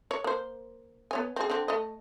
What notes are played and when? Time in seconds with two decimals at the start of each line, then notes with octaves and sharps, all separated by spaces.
0.11 C#5
0.24 A#3 C5
1.11 B3 C#5 G#5
1.36 C4 G#4
1.50 D3 C4
1.68 A3 D#5